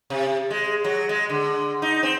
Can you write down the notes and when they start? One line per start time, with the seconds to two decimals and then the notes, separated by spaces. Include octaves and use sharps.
0.10 C3
0.50 G#3
0.84 F#3
1.09 G#3
1.30 D3
1.82 D#4
2.03 C4